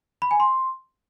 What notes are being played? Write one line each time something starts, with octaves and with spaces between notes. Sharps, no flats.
B5
G#5
C6